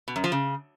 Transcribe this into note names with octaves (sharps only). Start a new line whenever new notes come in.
B2
F#2
F3
C#3